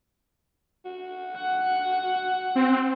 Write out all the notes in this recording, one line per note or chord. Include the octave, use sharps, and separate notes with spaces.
F#4
F#5
C4